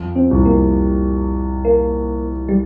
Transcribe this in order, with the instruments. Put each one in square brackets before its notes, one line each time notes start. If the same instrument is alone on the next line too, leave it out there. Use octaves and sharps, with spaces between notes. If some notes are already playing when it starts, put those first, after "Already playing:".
Already playing: [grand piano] F2 F3
[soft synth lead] C4
[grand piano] C2 C3
[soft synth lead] A#3
A#3
G3